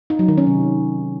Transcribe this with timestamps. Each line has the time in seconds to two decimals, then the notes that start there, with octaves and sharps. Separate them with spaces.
0.10 D#4
0.19 F#3
0.28 D#3
0.38 C#4
0.47 C3